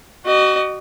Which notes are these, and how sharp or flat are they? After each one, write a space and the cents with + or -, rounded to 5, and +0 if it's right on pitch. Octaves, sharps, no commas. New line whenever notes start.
F#4 +30 D#5 -25